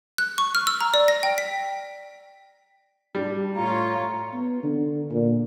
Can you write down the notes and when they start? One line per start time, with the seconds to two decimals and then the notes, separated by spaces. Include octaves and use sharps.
0.18 F#6
0.38 C#6
0.55 F6
0.67 E6
0.81 A#5
0.94 D5
1.08 A#6
1.23 G5
1.38 B6
3.15 G3 D4
3.55 A2 F4 C#5 A#5
4.33 B3
4.63 D3
5.11 A#2